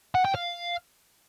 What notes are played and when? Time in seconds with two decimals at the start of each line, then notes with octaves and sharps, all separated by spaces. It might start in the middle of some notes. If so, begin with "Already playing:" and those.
0.15 F#5
0.25 G5
0.35 F5